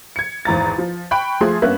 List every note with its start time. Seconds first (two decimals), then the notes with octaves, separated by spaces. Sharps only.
0.16 G#6 C#7
0.45 G#1 E2 A#5 A6
0.78 F3
1.11 G5 B5 C#6 F#6
1.41 F3 A3 G#4 C6
1.62 G2 A#3 B3 C#4 E5 F#6